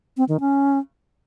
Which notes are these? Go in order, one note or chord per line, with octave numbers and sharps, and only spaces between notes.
C4
D#3
C#4